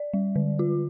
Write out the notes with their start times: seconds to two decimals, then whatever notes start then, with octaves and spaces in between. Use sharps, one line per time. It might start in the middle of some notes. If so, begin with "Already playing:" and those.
Already playing: D5
0.14 G3
0.36 D3
0.59 F4